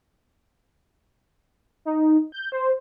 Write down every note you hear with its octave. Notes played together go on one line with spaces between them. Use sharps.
D#4
G6
C5